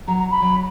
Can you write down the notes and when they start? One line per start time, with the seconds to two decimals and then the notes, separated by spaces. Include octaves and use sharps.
0.08 F#3 A#5
0.19 A#5
0.31 B5
0.42 F#3